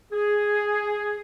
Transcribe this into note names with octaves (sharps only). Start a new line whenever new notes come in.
G#4